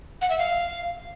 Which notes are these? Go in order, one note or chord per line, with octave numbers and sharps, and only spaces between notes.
F#5
E5
F5